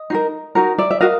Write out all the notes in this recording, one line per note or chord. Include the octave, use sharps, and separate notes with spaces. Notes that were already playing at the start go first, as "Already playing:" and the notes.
Already playing: D#5
D#4 F#4 A#4
D#4 F#4 A#4
D5 E5
E5
F#4 A#4 D#5 F5